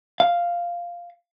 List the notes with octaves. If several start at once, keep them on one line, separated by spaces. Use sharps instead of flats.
F5